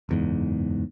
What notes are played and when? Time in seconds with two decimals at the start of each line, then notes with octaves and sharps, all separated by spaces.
0.09 F#1 E2 G#2